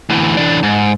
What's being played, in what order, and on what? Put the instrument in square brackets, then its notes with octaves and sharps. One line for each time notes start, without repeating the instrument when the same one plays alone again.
[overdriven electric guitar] D2 E3
E3 D4
G#2